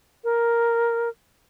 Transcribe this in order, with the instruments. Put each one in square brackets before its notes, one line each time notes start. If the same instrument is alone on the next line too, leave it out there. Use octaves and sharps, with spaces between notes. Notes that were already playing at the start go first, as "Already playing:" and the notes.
[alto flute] A#4